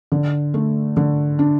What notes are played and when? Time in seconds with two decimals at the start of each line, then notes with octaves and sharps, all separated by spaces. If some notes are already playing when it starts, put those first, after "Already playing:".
0.12 D3
0.54 A3
0.97 D3
1.39 D4